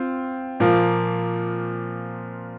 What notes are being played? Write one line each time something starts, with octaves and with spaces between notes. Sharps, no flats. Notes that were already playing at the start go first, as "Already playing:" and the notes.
Already playing: C4 F4
A#2 F3 A#3